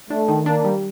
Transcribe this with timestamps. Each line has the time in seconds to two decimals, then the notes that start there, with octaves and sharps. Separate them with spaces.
0.10 A3 D4
0.28 D#3
0.46 A#3 D4
0.64 G3